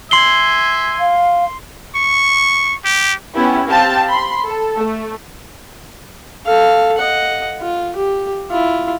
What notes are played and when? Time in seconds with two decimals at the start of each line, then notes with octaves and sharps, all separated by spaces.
0.11 E5 G#5 C6 C7 G7
1.00 F5
1.95 C#6
2.84 G4
3.34 B3 C#4 E4 G4
3.68 C4 G4 F5 G5 A5
4.08 B5 C6
4.45 A4
4.77 A3
6.46 A4 F5
6.98 D#5 F#5
7.61 F4
7.96 G4
8.51 E4 F4